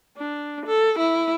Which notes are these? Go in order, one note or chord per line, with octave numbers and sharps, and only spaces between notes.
D4
A4
E4